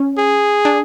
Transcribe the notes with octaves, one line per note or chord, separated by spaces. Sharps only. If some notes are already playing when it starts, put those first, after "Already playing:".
Already playing: C#4
G#4
D4